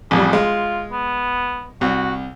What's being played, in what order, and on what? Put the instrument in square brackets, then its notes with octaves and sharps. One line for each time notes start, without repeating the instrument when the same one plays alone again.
[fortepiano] A1 F2 G3 [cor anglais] G#4
[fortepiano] G#3 [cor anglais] F4
[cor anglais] B3
[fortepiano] C2 [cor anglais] F#4